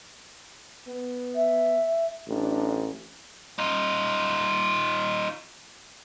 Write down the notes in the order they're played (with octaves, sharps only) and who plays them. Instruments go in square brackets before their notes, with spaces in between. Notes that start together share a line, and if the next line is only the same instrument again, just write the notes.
[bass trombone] B3
[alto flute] E5
[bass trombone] A1 [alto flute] D4
[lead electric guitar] D#4 F4